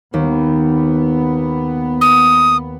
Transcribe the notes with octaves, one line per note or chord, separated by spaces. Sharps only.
D#2 B3
D#6